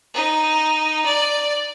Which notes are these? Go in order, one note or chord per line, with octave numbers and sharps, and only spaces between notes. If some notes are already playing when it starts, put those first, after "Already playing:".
D#4
D5